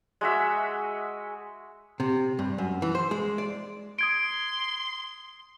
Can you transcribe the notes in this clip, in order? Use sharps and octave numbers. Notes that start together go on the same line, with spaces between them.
G#3 F#4 E5
C3
G2
F#2
E3
C5
G#3
D5
C6 D#6 G#6 D7